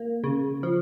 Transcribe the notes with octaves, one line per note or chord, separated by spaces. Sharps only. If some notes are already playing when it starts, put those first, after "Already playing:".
Already playing: A#3
C#3
F3